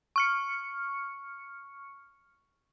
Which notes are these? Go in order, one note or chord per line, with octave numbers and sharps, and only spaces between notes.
C#6 F6 C#7